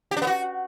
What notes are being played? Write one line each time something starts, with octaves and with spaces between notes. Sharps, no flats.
G4
D4
B3
F#4